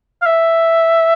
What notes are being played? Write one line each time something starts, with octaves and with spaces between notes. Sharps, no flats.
F5
E5